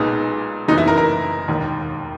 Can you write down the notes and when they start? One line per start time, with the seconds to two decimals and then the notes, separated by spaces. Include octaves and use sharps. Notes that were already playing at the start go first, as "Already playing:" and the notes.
Already playing: B1 A#2 G#3 B3 D#4
0.68 F#1 F#2 E3 B3 D#4
0.78 E4
0.88 A#4
0.98 A#4
1.48 E1 D#2 D#3